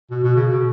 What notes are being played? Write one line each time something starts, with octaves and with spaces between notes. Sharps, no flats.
B2
B2
C#3
B2